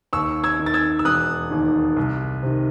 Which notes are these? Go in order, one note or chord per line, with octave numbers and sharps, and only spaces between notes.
D#2 C#6 E6
E6 G#6
D#3
A6
E6 G#6
E6
E1 D#6 F#6
D#2 D#3
C2
C3 D#3